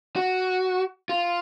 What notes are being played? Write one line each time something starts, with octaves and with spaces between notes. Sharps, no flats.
F#4
F4